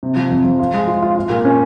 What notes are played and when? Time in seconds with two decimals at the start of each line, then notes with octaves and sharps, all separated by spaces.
0.03 C3
0.16 F3
0.31 F2
0.44 F3
0.59 F4
0.73 G#3
0.88 F4
1.02 F4
1.16 F4
1.30 A#2
1.45 C#4